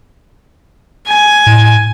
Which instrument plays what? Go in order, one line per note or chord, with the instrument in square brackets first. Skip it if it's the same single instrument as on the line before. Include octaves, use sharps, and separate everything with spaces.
[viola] G#5
[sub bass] A2